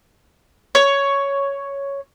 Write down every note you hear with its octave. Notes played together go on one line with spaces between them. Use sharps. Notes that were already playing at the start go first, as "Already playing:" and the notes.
C#5